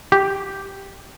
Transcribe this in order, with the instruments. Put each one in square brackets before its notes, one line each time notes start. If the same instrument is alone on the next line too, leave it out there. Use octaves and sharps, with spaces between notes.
[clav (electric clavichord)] G4